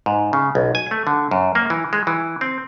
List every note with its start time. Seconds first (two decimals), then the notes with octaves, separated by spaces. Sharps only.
0.06 G#2
0.33 C#3
0.55 B1
0.75 G#5
0.91 A3
1.07 D3
1.31 F#2
1.55 A#3
1.70 E3
1.93 G#3
2.07 E3
2.41 C4